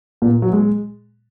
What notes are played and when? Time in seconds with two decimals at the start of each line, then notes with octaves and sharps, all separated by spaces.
0.22 A#2
0.42 F#3
0.53 G#3